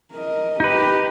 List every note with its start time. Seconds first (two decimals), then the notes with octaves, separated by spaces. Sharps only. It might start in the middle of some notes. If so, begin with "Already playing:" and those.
0.12 A#4 D#5
0.60 D#4 G4 B4